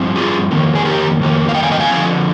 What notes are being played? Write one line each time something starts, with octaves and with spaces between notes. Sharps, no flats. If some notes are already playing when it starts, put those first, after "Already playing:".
Already playing: G2 F3 C4
F4 G#4
F2 D#3 A#3
G#4
G4 A#4
F2 D#3 A#3
F5
D#5 G5
F5 G#5
D#5 G5
F5 G#5
D3 F3 C4